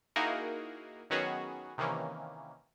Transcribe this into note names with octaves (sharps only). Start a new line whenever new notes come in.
A#3 D#4 E4 F#4 G#4 A#4
D#3 F#3 B3 C#4 F#4 G#4
C3 D#3 E3 A#3 C#4